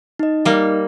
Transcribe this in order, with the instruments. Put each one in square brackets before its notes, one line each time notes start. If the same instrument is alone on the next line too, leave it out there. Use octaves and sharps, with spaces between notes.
[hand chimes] D#4 D#5
[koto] G3 A#3